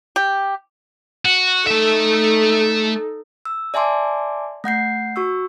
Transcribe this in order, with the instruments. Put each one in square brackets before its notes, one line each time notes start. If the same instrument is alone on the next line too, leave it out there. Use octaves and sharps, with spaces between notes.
[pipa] G4
[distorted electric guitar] F#4
[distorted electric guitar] A3 E5 [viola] D#4 A4
[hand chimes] E6
D5 E5 G#5 A5 C6 D6
A3 F#5 G6 C7
F#4 C#6 E6